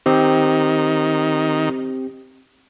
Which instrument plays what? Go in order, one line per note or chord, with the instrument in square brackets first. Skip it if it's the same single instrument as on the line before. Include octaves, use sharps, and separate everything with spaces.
[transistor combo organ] D#3 [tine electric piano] C4 G4